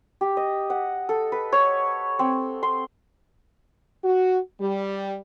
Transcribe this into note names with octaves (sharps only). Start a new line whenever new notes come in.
G4
D#5
F#5
A4
B4
C#5
C4
C6
F#4
G3